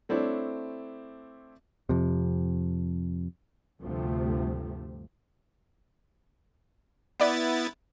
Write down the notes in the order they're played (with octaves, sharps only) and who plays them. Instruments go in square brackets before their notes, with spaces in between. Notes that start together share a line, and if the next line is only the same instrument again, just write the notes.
[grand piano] A3 C4 D4 E4 C5 C#5
[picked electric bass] F2 C3
[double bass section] D2 G2 C3 F3 G3 A3
[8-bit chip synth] B3 E4 A6 [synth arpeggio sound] B4 D5 F#6